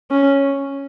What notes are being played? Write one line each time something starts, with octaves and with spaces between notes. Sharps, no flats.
C#4